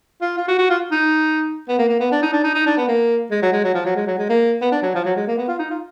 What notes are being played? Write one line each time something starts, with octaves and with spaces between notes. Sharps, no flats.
F4
F4
F#4
F#4
F4
D#4
B3
A#3
A#3
B3
D4
D#4
D4
D#4
D#4
D4
B3
A#3
G#3
F#3
G#3
F#3
F3
F#3
G#3
F#3
G#3
A#3
B3
D4
F#3
F3
F#3
G#3
A#3
B3
F4
D#4
F4